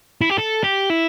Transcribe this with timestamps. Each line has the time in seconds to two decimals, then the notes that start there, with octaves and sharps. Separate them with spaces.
0.21 E4
0.30 G4
0.38 A4
0.64 G4
0.90 E4